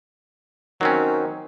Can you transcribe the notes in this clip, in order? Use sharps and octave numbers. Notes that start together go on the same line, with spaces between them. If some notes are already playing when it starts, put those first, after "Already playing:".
D#3 F#3 C4 C#4